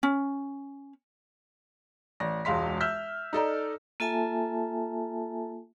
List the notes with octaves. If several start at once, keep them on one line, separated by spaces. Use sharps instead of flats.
C#4
A1 D5 A#6
E1 C#2 G#3 F5 C6 B6
E5 E6 F6 G6 B6
D#4 A4 D5 A#5
A#3 F4 A4 E5 G#5 A5